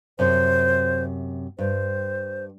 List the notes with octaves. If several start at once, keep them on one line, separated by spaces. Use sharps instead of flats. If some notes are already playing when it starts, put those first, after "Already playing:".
F#2 C3 C5
G2 C5